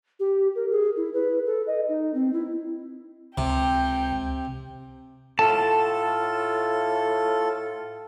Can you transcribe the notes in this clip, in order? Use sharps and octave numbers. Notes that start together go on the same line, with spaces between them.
G4
A#4
G#4
E4
B4
A4
D#5
D#4
C4
E4
C#2 C3 G5
A2 F4 A4 A5